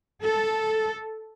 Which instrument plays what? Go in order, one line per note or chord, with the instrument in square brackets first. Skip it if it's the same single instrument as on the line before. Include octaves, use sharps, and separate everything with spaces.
[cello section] A4